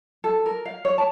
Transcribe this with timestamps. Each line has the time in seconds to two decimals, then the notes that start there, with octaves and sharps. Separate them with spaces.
0.24 A4
0.46 A#4
0.65 F5
0.85 C#5
0.98 A5